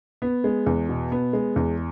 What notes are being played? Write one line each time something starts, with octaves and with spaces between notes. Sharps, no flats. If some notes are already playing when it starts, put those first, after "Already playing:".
B3
G#3
E2
B2
B3
G#3
E2